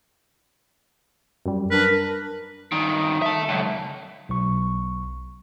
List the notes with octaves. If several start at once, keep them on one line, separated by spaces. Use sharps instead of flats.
F#2 G3
D4 A#4 B4
G2 D#3
E5 A5
C#2 F#2
B1 C#6